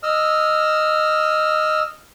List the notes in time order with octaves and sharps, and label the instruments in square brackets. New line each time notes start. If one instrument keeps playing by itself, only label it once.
[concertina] D#5 E6 F6